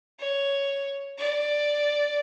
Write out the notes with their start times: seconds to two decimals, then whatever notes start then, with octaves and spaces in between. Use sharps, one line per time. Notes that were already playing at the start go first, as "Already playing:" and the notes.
0.19 C#5
1.18 D5